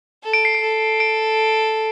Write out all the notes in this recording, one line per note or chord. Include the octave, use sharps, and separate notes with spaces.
A4
D7
C7
D7
A4
D7